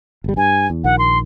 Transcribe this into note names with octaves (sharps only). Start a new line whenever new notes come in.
G1 G3
G2 G#5
E2
A#1 D#3 F#5
C6